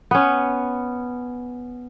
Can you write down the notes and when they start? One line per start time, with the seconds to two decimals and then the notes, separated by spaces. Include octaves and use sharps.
0.11 B3 C#4